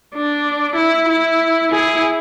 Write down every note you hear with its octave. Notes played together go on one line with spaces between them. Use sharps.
D4
E4
E4
E4 G#4